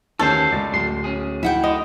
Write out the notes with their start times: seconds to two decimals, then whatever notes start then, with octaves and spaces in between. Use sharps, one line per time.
0.19 D#2 E3 F#3 C#4 A4 C5 C#5
0.52 C#2 D5 A6
0.73 D1 F#2 C6
1.04 C#4 G#4
1.43 E4 F#5 G5
1.64 D3 D#5